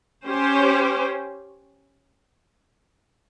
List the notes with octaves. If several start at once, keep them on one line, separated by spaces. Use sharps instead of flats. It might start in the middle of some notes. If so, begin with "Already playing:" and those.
C#4 G4 C5